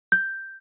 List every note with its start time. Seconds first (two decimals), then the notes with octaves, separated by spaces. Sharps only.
0.12 G6